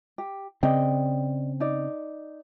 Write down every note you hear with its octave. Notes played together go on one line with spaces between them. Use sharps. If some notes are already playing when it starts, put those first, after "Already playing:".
G4
C#3 C4 D5 D#5 G5
D#4 D5